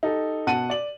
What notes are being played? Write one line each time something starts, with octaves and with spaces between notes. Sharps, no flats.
D#4 G4 A4
B2 F#5 A5 D#7
D5 F#7